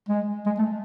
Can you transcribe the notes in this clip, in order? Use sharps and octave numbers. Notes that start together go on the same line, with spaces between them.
G#3
G#3
A3